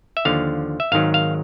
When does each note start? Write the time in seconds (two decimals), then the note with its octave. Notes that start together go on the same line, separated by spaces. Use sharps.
0.17 E5
0.25 D#2 D3 F3 F5
0.80 E5
0.92 G#1 G#2 D#3 F#3 F5
1.14 F5